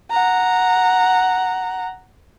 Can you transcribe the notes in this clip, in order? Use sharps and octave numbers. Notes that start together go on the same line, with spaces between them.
F#5 A#5